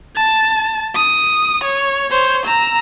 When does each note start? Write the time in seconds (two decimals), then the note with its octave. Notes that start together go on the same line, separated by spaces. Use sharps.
0.16 A5
0.96 D#6
1.64 C#5
2.11 C5 C#5
2.46 A#5 E6